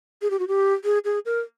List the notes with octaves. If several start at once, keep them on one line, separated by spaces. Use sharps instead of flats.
G#4
G4
F#4
G4
G#4
G#4
A#4